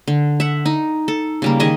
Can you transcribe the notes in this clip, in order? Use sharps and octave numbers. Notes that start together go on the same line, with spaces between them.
D3
E5 F#5
D#4
A4
C#3 G3 A#3
D#3 G#4 D#5 E5